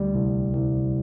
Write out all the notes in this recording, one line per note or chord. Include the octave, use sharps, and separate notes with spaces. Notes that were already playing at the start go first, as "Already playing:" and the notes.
Already playing: D2 G3
C2
C2